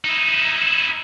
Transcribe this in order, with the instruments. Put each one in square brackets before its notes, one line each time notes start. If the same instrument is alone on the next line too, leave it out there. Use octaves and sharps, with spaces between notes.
[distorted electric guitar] D#4 E4